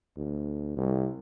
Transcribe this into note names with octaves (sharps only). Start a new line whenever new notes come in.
D2
C2